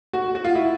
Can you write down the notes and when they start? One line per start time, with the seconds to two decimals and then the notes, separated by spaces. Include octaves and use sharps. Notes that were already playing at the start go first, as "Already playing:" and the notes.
0.13 F#4
0.35 F#4
0.45 F4
0.55 E4